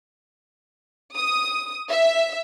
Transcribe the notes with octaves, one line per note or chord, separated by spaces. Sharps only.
D#6
E5